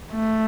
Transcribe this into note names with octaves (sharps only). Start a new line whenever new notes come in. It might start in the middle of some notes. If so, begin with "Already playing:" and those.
A3